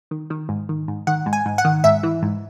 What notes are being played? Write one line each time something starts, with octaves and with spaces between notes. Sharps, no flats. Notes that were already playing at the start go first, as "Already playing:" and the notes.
D#3
D#3
G#2
D#3
G#2
D#3 F#5
G#2
G#5
G#2
F#5
D#3
G#2 E5
E3
G#2